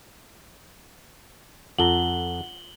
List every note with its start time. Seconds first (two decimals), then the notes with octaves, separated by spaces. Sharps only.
1.78 F2 F4 A4 F#5 A#5 F#7 G7